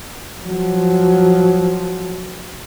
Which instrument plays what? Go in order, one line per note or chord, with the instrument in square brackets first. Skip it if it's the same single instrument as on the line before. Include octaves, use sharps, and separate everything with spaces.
[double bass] F3 F#3